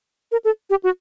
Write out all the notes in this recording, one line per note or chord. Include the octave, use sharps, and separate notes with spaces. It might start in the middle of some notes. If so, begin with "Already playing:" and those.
A#4
A4
G4
F#4